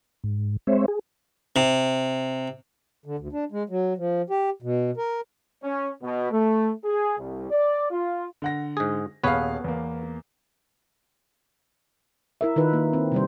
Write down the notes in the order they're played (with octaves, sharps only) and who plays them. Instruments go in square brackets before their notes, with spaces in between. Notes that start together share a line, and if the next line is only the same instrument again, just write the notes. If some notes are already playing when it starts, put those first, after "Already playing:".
[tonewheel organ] G#2
G#3 C4 C5 C#5 E5
G#4
[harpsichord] C3
[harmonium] D3
D2
D4
G#3
F#3
F3
G4
B2
A#4
[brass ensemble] C#4
B2
A3
G#4
C2
D5
F4
[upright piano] D3 F#5 A#6
[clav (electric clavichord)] G#2 G#4
[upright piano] D#1 G#4 F5 [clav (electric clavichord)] B3 B4 C#5
[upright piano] E2 A#3
[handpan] E4 A#4 E5
D#3 D#4 F4 B4
A#3
C4
C3 G3 C5